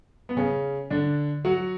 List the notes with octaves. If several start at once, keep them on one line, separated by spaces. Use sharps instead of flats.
B3
C#3 C#4
D3 D4
F#3 F#4